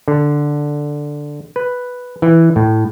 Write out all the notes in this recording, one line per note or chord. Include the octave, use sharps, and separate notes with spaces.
D3
B4
E3
A2